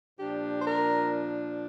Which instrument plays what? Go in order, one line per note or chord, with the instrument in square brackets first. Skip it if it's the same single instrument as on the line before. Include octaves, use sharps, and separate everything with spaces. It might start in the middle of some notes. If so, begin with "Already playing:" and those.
[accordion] A#2 F3 D4 [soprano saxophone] G4
[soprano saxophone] C5
A#4